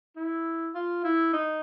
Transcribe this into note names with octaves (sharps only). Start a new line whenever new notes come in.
E4
F4
E4
D#4